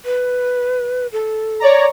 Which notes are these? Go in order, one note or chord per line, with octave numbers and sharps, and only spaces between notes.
B4
A4
C#5 D5 A#5